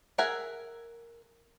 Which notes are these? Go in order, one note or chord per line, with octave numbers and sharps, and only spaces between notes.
G#4 A#4 E5 F#5 G#5